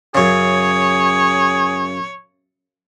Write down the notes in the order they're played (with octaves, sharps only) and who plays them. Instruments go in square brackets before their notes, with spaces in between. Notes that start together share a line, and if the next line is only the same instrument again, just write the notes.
[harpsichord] F#2 C#3 [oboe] G#4 [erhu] C#5